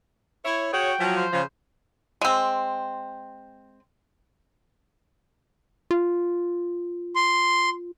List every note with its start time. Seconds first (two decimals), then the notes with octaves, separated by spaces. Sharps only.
0.45 E4 C#5
0.73 F#4 G#4 C#5 G5
1.00 F3 F#3
1.16 C5
1.33 C#3 F3
2.21 G#3 C4
5.91 F4
7.15 C6